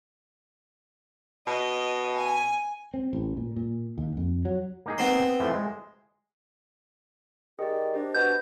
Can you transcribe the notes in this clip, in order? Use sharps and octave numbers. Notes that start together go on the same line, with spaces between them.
B2 D#5
G#5
C4
A1
A#2
A#2
D#2
F2
F#3
A#3 D#4 G#4
B3 C4 C6
E3 F3 A3
G#3
D#3 G4 G#4 D5
D4 G4 C5 D#5
B2 G6